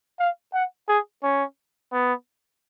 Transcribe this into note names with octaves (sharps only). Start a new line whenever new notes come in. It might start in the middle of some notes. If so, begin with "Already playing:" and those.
F5
F#5
G#4
C#4
B3